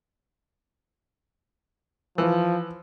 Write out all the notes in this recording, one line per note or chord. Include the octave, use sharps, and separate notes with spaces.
E3 F3